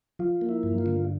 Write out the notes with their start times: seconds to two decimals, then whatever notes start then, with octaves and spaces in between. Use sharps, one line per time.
0.19 F3 F4
0.41 A#3
0.49 E4
0.63 G2
0.78 F4
0.86 D3